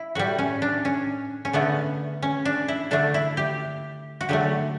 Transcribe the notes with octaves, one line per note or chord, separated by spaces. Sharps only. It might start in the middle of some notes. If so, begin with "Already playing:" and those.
Already playing: E4
A2 G3 F#4
C#4
D4
C#4
C#4
D3 A3 B3
C#4
D4
E4
D3 A3 D4
E4
G4
F#4
D3 F#3 A3 G4